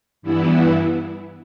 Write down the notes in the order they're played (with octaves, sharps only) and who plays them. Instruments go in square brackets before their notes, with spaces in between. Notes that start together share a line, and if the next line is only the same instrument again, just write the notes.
[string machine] G2 E3 B3 E4